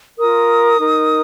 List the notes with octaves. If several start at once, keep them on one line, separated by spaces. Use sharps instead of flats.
F4 A#4 D#6
D#4 A#4